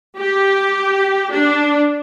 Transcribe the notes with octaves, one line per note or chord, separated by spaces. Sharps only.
G4
D4